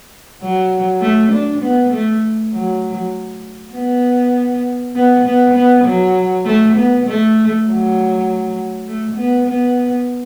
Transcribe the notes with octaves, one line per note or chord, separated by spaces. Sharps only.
F#3
A3
D4
B3
A3
F#3
B3
B3
B3
B3
F#3
A3
B3
A3
F#3
A3
B3
B3